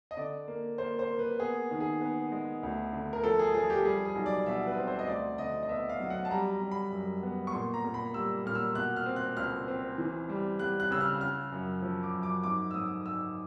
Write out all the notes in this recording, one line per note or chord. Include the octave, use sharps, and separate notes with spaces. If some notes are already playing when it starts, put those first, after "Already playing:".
D#5
D3 D5
A#3
A#3 C5
C5
A#3
B4
B3 G#4
D#3
G#4
B3
G#3
D2
D3
A#4
F3 A4
G#4
F3 G#4
G4
G3 G#4
G#4
B1
D5
B2 E5
B4
C4
C5
D#5
D2 D5
D3 D#5
D#5
B3 E5
F5
F#3
F#5
A5
G3 A#5
A#5
G3
B5
F#2
B3
C#6
A#2 C6
A#5
A#2
B5
G3 E6
A#2 F6
E6
B2 F#6
F6
C4
F#6
C#2 F6
C4
E3
G3
G3 F#6
F#6
C#3 E6
F6
C#3 F6
F#2
F3
D6
F#2
D6
G#2 D6
E6
G#2 D#6
G#2 E6